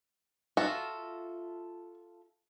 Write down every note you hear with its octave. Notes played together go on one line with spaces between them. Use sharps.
F4 F#4 A4 E5